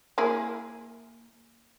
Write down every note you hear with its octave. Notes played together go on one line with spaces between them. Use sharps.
A#3 E4 G#4